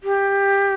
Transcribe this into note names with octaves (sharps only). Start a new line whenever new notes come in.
G4